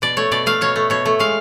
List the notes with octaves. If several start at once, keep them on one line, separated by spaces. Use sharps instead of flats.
B2 D5
A3 C#5
B2 D5
A3 F5
B2 C#5
A3
B2 C#5
A3
G#3 F5